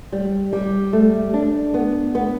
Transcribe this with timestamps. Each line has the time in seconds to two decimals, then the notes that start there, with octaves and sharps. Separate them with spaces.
0.12 G3
0.53 G3
0.93 A3
1.34 D4
1.74 B3
2.15 B3